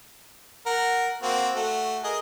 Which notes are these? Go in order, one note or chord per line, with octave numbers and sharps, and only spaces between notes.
A#4 F#5
A#3 C4 F#4
A3 F#4
G#4 A#4 D#5